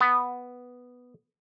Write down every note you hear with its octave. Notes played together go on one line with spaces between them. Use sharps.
B3